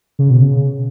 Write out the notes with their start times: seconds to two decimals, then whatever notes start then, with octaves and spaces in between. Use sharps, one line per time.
0.19 C#3
0.30 B2
0.42 C#3